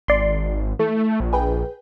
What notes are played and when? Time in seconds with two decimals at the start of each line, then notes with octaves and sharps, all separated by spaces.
0.08 G#1 D5 C6
0.79 E3 A3 A4
1.20 A#1
1.33 G#4 B4 G5